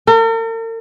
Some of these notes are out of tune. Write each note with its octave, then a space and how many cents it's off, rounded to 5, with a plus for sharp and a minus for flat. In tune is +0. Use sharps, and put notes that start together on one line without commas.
A#4 -45